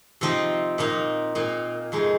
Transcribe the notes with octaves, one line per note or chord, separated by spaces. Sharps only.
C3 F3 C4 D#4
A#2 A#3 D#4
A#2 A#3 D#4
F2 C3 G#3 D#4 G#4